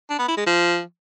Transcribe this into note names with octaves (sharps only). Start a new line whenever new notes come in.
D4
B3
E4
G#3
F3